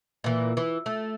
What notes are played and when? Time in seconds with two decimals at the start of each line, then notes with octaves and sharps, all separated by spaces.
0.24 A#2 E3
0.57 E3
0.86 A3